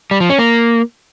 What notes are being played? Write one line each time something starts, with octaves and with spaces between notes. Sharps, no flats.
G3
F3
C#4
A#3